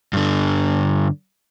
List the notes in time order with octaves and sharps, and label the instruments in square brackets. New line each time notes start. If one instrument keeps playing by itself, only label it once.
[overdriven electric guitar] G2 D3